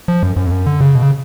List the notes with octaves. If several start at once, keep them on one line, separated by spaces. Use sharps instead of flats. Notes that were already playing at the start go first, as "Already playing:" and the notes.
F3
F#2
F#2
F2
F#2
D3
C#3
B2
C#3